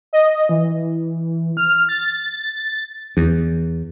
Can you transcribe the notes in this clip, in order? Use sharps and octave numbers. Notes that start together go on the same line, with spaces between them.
D#5
E3
F6
A6
E2